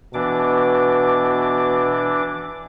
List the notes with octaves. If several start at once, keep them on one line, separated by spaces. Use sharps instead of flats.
B2 E3 D4 D6